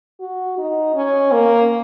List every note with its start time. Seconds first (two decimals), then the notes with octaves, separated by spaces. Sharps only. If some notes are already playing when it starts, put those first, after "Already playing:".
0.20 F#4
0.58 D#4
0.95 C#4
1.32 A#3